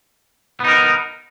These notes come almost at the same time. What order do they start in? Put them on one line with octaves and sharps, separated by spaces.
B3 D#4 A#4